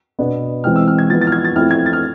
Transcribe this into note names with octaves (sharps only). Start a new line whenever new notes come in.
B2 B3 D4
E3 G#3 C4 F6
E6
F6
G#6
F3 B3 E4 A6
A6
F6
G#6
A6
F3 A3 C4 E4 F6
G#6
A6
F6